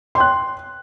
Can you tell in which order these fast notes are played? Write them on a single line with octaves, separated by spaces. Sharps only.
C6 G5 F#6